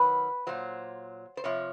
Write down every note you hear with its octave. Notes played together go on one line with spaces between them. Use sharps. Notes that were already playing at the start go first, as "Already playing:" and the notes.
Already playing: D#3 F#3 B4
A#2 F#3 C5
C5
C3 F3 C#5